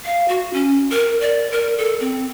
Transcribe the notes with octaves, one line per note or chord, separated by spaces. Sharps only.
F5
F#4
C#4
A#4
D5
A#4
A4
C4